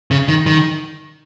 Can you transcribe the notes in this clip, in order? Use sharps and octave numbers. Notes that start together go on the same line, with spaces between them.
C#3
D#3
D#3